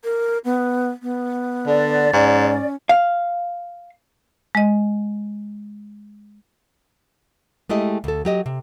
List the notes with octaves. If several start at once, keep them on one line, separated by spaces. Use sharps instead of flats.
A#4
B3
B3
D3 D5
G#2 C#4
F5
G#3 D#5
G#3 A3 E4 G4 D#5
D2 A4
F#3 G4 D#5
C3